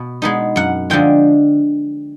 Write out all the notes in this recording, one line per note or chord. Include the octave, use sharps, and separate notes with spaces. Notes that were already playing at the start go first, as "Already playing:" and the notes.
Already playing: B2
G#3 B3 D#4
F#2 F#5
D3 F3 G#3 G5